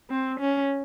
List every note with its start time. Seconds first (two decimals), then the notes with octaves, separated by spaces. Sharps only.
0.10 C4
0.40 C#4